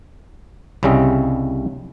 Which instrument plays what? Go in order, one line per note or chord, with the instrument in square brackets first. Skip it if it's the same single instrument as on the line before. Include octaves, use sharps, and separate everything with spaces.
[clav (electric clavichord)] C2 C#3 G3 C#4 D#5 E5